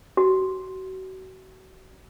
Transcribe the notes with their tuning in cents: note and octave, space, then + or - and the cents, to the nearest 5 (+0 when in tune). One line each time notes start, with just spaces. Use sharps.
F#4 +30